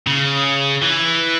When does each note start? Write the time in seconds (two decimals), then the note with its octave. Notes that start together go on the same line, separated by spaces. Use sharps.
0.07 C#3
0.82 E3